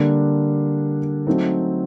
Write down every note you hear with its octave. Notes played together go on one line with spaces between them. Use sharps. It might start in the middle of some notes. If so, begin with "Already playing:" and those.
Already playing: D3 G3 A#3 D4
F#3 A3 C4 D#4